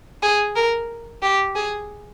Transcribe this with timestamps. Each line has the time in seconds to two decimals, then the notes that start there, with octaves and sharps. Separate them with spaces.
0.23 G#4
0.56 A#4
1.23 G4
1.56 G#4